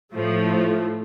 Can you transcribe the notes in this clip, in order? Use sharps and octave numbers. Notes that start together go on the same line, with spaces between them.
A2 F3 A3